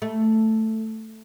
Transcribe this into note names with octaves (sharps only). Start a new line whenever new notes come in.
A3